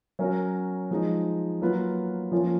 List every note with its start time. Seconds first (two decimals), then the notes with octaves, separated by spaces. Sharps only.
0.19 F#3 C#4 F#4 A#4
0.91 F3 G#3 D#4
1.61 F#3 A#3 F4 B4
2.32 F3 A#3 C#4 F4